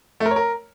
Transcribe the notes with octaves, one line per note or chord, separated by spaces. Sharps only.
A3
A#4
C#5
A#4